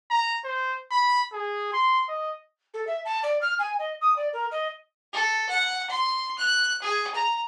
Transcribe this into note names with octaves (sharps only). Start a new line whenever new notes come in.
A#5
C5
B5
G#4
C6
D#5
A4
E5
A5
D5
F6
G#5
D#5
D#6
D5
A#4
D#5
A4
F#5
C6
F#6
G#4
A#5